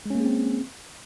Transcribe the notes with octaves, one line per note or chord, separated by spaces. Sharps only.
G#3 A#3 C4 C#4 G#4